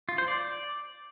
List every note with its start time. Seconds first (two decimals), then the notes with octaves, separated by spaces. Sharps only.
0.09 F4
0.18 C5
0.28 D5